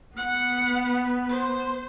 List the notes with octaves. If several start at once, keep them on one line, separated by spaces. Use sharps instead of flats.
B3 F#5
C5